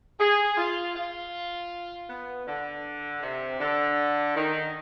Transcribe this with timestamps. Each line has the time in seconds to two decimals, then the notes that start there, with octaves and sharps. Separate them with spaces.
0.20 G#4
0.57 F4
0.95 F4
2.09 B3
2.47 D3
3.22 C3
3.60 D3
4.36 D#3